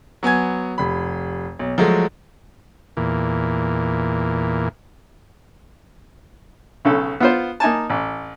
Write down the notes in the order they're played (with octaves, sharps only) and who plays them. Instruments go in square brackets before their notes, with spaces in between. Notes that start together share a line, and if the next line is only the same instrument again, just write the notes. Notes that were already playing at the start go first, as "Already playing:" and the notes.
[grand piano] F#3 B3 G#5 G#6
F1 B5
B1
F3 F#3 G#3 A3
[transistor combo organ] E2 A#2
[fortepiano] B1 C#3 A4
B3 F4 C5
A#3 D#4 G#5 A5
A1